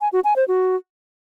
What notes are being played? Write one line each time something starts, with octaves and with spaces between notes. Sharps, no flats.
G#5
F#4
G#5
C5
F#4